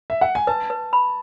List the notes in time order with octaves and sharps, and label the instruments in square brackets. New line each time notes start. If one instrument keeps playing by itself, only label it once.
[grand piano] E5
F#5
G#5
[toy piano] B4 [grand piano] A5
[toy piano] B4
B5